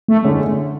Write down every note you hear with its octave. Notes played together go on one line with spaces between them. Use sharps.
A3
D3 G#3 C#4